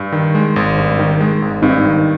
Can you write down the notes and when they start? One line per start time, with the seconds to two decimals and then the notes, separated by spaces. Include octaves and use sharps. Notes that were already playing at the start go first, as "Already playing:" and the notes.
Already playing: G2
0.12 D#3
0.35 G#3
0.56 G#1
0.78 G2
0.99 D#3
1.20 G#3
1.42 G#1
1.62 G2 C4 D#4
1.84 D#3